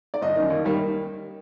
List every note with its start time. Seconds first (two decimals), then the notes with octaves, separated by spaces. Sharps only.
0.14 D5
0.22 G1 D#5
0.36 F#2 D#3
0.50 D#2
0.64 D#3 G3 A#3